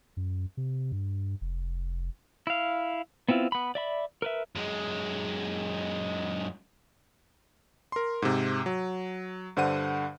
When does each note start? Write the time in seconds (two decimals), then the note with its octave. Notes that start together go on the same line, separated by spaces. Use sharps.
0.17 F#2
0.57 C3
0.92 G2
1.41 F1
2.47 E4 F5
3.29 B3 C4 E4 F4
3.52 B3 B5
3.75 D5 E5 B5
4.22 A#4 B4 E5
4.55 F#2 G#3
7.92 A#4 C6
8.22 G#2 C3
8.66 F#3
9.57 G2 D3 C5 F#5 D#7